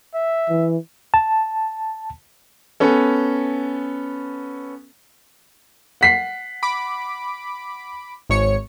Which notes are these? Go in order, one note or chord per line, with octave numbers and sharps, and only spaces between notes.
E5
E3
A5
B3 C#4 A4
F#5 B6 C7
B5 D6
G#1 C#5 C#7